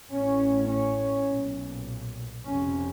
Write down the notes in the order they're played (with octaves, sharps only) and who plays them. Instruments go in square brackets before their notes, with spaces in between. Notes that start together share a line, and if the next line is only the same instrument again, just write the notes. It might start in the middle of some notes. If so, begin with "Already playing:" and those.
[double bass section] A1 A2 C#4
C#4
B1 A#2
F1 F2 C3 C#4